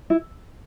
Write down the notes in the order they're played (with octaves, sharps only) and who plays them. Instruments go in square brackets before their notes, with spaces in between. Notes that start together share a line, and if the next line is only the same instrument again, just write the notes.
[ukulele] E4